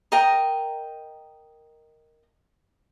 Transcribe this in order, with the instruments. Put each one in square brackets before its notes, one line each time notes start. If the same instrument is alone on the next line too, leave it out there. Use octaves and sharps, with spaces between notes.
[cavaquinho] A#4 D#5 G5 A#5